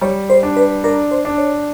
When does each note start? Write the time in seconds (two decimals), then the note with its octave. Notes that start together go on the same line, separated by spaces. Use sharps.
0.01 G3 C#5
0.30 C5
0.43 D4
0.56 B4
0.84 D4 A#4
1.11 C5
1.25 D4
1.38 C#5